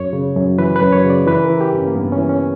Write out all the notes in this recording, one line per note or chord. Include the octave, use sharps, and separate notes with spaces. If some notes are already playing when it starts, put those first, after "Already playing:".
Already playing: F#2 C#5
C#3
F#2
E3 B4
B4
F#2
C#5
C#3
D5
E3 B4
A#4
E3
G4
G2
C#4
A#3
G2 B3
C#4
E3
C#4